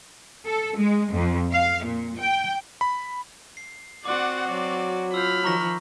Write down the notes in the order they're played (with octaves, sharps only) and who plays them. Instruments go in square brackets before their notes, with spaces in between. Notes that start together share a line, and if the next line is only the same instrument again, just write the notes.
[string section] A4
G#3
F2
F5
A#2
G5
[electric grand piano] B5
[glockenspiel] C7
[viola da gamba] C4 F#4 [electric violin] D5 F#5 [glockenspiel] C6 D6
[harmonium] F#3 [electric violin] D5
[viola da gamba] F4 [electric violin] B5 F6 [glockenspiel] E6 G6
[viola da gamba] D#3 F3 [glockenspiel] A#5 C#6 A#6